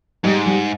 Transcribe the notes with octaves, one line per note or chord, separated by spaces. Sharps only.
G#2 G3
G3